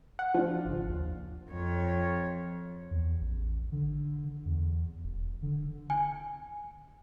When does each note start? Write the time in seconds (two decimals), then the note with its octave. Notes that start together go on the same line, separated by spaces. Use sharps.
0.19 F#5
0.34 F3 D4 F4
0.65 G#1 C#3
0.89 D#2
1.51 F2 C#5
2.91 E2
3.21 A1
3.72 D3
4.45 E2
5.04 D#1
5.42 D3
5.90 G#5